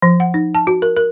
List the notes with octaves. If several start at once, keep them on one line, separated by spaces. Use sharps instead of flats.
F3
F#5
D#4
A5
F#4
A#4
A#4